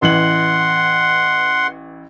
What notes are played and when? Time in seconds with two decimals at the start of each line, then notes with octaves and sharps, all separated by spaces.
0.02 A1 E3 F#5 C6 F#7